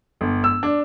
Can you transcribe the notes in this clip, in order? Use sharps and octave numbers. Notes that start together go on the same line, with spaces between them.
G1
E6
D4